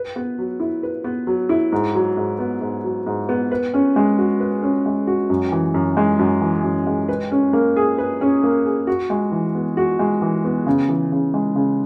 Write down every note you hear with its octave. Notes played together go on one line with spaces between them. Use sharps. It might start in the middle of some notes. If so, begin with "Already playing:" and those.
Already playing: B4
B3
F#3
E4
B4
B3
F#3
E4
G#2
F#3
G#2
B3
G#2
F#3
G#2
B3
B4
C#4
G#3
F#4
B4
C#4
G#3
F#4
F#2
E3
F#2
G#3
F#2
E3
F#2
G#3
B4
C#4
A#3
G#4
B4
C#4
A#3
G#4
F#4
G#3
E3
B3
F#4
G#3
E3
B3
C#3
E3
C#3
G#3
C#3